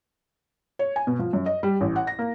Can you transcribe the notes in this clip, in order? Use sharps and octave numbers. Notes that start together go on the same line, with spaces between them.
C#5
G#5
B2
F3
F#2
D#5
G3
A1
F#5
A#6
A#3